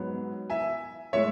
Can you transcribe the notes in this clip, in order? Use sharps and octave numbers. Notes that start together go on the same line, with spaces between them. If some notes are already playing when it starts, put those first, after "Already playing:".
Already playing: G#2 F#3 B3
E5 G#5
A2 G#3 C#5 E5